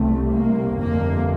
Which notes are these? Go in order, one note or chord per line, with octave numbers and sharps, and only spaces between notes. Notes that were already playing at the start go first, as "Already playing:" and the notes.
Already playing: C2 C3 A3
A#3
G1 F2 C3 A#3